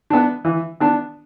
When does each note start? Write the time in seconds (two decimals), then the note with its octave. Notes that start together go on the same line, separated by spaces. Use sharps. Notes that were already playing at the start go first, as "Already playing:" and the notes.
0.10 B3 D4
0.45 E3
0.80 B3 D4